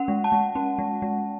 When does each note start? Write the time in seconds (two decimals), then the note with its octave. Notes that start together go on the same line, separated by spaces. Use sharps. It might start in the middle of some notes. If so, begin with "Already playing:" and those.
Already playing: C#4 F#5
0.08 G#3
0.24 A5
0.32 G#3
0.55 C#4
0.79 G#3
1.02 G#3